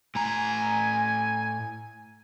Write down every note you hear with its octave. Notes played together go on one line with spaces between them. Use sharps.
A2 G#5 A#5